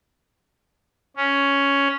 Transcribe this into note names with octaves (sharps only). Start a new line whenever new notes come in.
C#4